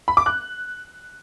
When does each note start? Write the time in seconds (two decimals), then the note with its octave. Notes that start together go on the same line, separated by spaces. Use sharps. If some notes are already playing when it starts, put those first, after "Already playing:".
0.08 B5
0.17 D6
0.26 F#6